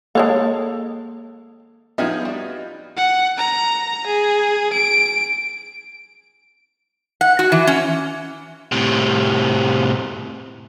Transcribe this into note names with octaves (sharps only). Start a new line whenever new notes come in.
G#3 A#3 A4 C#5 F5
F3 B3 C4 D#4 F4 G#4 E5 G#6
G3 F#4
F#5
A#5
G#4
D7
F#5
F#4
E3
C#4
A2 C3